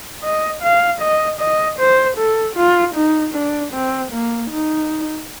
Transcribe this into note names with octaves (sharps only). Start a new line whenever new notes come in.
D#5
F5
D#5
D#5
C5
A4
F4
D#4
D4
C4
A#3
D#4